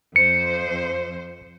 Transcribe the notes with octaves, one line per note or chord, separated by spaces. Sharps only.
F2 F3 C5 C#7